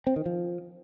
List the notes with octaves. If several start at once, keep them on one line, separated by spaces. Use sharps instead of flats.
C4
D#3
F3